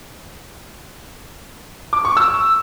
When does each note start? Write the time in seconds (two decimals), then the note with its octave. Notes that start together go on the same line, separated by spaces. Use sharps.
1.93 D6
2.05 C#6
2.17 E6